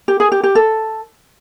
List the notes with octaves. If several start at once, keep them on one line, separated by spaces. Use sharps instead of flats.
G4
G#4
G4
G4
A4